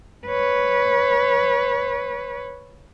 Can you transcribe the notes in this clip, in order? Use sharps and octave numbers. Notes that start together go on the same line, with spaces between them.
B4 C#5